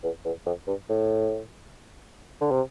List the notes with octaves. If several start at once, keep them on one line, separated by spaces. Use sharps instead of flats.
E2
E2
F2
G2
A2
D3
C3